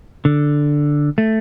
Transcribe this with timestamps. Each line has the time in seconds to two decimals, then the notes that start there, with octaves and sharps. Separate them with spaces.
0.25 D3
1.18 A3